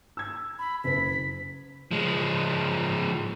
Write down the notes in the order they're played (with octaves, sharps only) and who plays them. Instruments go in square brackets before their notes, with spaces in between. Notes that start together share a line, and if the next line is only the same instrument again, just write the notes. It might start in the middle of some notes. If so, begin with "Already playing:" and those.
[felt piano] E6 G#6
[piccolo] B5
[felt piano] F#1 B4 [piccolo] B6
[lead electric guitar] F3 G#3